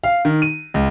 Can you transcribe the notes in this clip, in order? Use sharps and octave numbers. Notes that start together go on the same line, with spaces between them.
F5
D#3
D#7
C#2